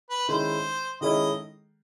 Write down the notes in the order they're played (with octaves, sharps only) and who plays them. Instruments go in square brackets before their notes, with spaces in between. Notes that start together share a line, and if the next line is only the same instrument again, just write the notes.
[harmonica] B4
[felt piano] D#3 G#3 C#4 E4 A4 [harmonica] C5
[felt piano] D#3 G#3 C#4 E4 A4 [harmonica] D#5